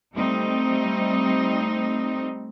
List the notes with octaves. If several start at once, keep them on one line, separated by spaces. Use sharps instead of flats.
G3 A3 C4 D#4